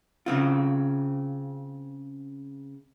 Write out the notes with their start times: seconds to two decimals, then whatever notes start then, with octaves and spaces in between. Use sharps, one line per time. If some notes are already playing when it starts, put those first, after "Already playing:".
0.26 C#3 C4 F4